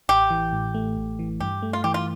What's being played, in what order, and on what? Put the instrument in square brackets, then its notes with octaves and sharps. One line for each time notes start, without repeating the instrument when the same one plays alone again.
[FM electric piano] A1 [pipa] G4
[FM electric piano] E3
A2
A3
A1
E3
[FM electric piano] G2 [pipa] G4
[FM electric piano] A3
[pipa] F4
[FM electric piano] E3 [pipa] G4
[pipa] F4